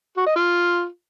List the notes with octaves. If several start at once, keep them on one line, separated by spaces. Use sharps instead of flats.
F#4
D#5
F4